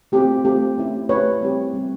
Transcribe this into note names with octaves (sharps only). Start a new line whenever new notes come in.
A3 C4 F4 G4
A3 C4 F4 G4
A3 C#4 E4 G4
A3 C#4 E4 G4 B4 C#5
G3 C4 E4 G4
G3 C4 E4 G4